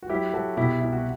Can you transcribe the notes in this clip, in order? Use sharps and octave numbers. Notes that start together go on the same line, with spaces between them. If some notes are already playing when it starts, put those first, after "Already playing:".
F#4
F#3 E4 G4
F#3 F#4 A4
B2 E4 G4
C2 E4
F#4